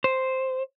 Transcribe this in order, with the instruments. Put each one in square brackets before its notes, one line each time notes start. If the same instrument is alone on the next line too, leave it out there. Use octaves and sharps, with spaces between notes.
[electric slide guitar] C5